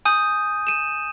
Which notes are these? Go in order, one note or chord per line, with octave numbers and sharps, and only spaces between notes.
G#5 D#6 G6 D#7
D#7 E7